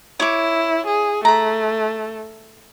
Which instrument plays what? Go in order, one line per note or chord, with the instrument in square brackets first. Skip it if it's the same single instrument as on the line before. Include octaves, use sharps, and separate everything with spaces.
[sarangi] E4 [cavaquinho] C#5 D6
[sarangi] G#4
[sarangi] A3 [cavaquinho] A#5 B5